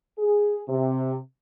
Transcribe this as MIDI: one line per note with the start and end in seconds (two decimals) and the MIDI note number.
0.18 0.60 68
0.68 1.16 48